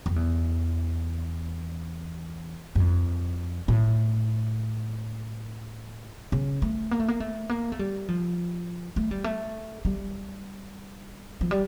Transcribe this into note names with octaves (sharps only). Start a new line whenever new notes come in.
F2
E2
G2
F2
A2
C#3
A3
A#3
A3
A#3
A3
A#3
A3
G3
F3
A3
G3
A3
G3
F3
G3